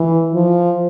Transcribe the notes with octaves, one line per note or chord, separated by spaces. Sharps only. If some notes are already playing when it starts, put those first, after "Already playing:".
Already playing: E3
F3